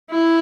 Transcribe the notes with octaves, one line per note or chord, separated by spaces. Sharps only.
E4